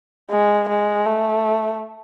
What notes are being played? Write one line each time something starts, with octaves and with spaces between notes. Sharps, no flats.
G#3
G#3
A3